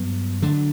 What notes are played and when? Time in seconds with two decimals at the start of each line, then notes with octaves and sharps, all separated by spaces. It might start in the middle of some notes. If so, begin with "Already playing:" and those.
Already playing: G2 F#3 B3
0.42 D3 F#3 A3 D4